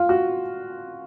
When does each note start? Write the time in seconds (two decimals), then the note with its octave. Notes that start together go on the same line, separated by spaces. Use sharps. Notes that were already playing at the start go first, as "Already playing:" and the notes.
Already playing: F4
0.09 F#4